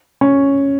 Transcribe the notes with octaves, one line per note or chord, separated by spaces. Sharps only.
C#4